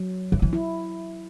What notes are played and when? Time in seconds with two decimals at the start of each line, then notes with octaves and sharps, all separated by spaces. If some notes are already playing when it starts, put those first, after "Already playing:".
Already playing: F#3
0.32 E3
0.42 E3
0.53 E4